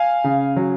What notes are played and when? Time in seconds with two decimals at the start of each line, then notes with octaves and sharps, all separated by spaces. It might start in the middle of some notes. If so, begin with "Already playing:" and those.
Already playing: F5 G#5
0.24 C#3
0.56 F#3